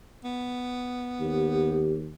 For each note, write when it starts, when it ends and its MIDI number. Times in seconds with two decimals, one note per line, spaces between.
0.24 2.03 59
1.20 2.12 39
1.20 1.99 67